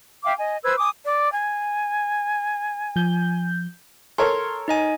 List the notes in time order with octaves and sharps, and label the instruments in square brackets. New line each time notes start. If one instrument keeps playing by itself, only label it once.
[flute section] E5 F5 G5 D6
D#5 G#5
B4 C5 E6 G#6
G#5 D6 D#6
[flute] D5
G#5
[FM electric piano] F3 G6
[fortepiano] A4 A#4 C#5 [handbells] C6
[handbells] D#4 D#5 G#5